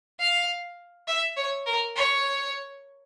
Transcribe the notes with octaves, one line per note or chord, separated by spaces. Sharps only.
F5
E5
C#5
A#4
C#5